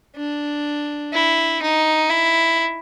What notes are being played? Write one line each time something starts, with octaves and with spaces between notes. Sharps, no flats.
D4
E4
D#4
E4